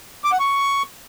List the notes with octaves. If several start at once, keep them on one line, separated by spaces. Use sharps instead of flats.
D6
F#5
C#6